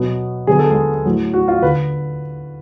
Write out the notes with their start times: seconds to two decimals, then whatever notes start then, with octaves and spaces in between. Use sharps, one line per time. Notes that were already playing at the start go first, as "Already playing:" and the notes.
Already playing: B2 F#3 B3
0.47 D3 F#3 B3 G#4
0.59 A4
0.71 G#3 G#4
1.05 A2 F#3 A3
1.34 F#4
1.48 F4
1.62 D3 B4